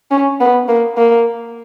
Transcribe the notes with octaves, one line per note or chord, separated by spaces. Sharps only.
C#4
B3
A#3
A#3